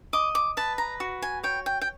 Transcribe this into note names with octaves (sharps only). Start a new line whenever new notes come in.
D#5 D6
D6
B4 A5
A#5
F#4
G#5
C#5 G5
G5
G5